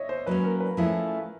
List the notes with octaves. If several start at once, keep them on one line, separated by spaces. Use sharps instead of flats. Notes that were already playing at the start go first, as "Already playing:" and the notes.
Already playing: C#5 D#5 E5
C5
F#3 A#3 C#4 B4
A#4
B4
F3 A3 C#4 E4 G#4